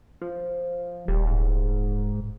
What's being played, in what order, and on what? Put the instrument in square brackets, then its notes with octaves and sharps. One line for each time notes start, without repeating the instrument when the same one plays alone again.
[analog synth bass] F3
[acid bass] D#1 [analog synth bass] G3
[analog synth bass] G#2